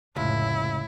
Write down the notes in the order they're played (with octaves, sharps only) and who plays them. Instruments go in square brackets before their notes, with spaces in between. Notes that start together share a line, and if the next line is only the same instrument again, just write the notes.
[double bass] F1 A2 [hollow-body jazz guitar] C#2 [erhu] E4